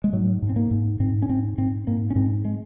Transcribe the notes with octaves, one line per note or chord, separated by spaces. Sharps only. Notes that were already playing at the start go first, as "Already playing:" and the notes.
G#3
G#2 F#3
G#2
C4
A#3
G#2
G#2 C4
C#4
G#2 C4
G#2 C4
G#2 A#3
C#4
G#2 C4
G#3